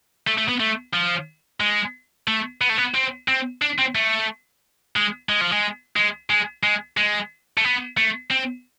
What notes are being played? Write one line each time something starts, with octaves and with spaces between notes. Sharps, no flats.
A3
A3
B3
A3
F3
G#3
A3
B3
A3
B3
C4
C4
D4
C4
A3
G#3
G#3
F3
G#3
G#3
G#3
G#3
G#3
A3
B3
A3
C4